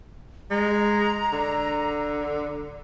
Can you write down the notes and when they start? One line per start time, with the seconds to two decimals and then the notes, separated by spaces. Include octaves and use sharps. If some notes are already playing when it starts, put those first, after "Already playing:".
0.51 G#3 A#5
1.32 D3